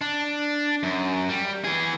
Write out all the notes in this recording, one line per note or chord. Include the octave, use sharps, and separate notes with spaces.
D4
F#2
G3
E3 G#4